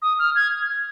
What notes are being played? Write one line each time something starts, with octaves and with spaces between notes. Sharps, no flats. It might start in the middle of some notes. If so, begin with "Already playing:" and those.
D#6
F6
G#6